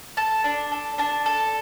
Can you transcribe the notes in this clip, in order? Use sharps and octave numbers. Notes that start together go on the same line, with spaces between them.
A4 A5
D4
A4
D4 A5
A4